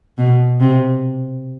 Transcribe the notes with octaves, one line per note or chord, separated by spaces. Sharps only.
B2
C3